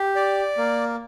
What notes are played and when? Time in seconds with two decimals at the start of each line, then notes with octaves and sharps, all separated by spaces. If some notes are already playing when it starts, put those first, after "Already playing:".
Already playing: G4
0.16 D5
0.58 A#3